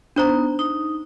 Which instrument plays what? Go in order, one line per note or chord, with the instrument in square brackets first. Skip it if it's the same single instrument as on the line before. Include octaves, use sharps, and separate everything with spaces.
[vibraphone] B3 D#4 [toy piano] D4 C5 A#5
[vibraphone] D#4